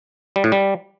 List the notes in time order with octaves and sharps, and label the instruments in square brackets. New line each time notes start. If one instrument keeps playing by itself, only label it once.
[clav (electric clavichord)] G3
A2
G3